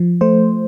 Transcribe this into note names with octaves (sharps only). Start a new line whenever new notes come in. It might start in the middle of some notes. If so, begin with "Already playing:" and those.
Already playing: F3
A3 C5